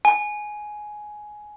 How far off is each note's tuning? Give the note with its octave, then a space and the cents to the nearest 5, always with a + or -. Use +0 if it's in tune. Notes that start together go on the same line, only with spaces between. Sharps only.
G#5 +10